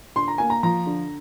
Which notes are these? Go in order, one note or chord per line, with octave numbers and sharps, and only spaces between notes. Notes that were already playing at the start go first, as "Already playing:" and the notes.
D3 C6
A#5
A#3 G#5
A#5
F3 A#5
D3